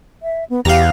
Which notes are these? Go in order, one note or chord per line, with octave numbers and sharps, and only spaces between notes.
E5
B3
E2 G4 F5 A#5